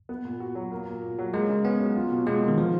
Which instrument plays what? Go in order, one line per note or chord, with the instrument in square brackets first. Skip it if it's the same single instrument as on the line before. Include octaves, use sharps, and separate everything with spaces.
[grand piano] B3
A#2
F#4
F#3
A#3
A#2
A#2
F#3
[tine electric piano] G#3 [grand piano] A#3
[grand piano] C#3
[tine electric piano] B3 [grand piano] C#4
[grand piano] F#3
F4
B2
[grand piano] B2 [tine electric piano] G#3
[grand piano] A#3
[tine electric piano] D#3
[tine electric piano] F3 [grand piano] F4